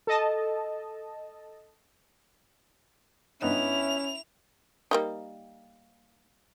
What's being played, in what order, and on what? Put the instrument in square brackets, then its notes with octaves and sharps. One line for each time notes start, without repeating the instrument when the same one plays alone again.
[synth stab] A4 D#5 A5
[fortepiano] G2 B3 D#4 [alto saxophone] C#4 [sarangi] E4 [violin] F7
[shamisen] G3 A#3 D#4